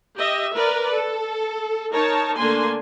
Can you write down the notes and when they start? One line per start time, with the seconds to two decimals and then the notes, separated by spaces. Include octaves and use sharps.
0.16 G4 D#5 E5
0.54 A#4 B4 D5
0.91 A4
1.94 D#4 A#4 C#5 A5
2.38 D3 A3 A#3 D4 G#5 C6